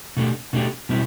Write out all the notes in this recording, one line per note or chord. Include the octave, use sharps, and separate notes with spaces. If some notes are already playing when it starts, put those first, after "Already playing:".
B2 A3 D4 G4
B2 A3 D4 G4
B2 G3 C4 E4